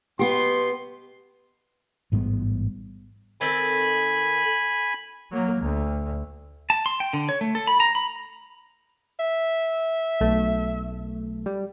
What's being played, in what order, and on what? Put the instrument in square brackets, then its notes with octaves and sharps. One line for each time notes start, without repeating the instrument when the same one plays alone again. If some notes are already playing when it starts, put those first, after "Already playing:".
[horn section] B2 C6 [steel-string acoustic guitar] B3 G4
[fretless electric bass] A1 G#2 G3 B3
[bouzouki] D#3 C4 A4 [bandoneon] G#5 B5
[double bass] F#3 A#3
D2
[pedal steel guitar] A5
C6
G5
D3
C#5
A3
A4
B5
A#5
B5
[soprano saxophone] E5
[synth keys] B1 A3
G3